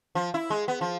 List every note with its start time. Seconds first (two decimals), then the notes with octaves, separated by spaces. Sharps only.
0.15 F3
0.34 E4
0.50 G#3
0.68 B3
0.81 F3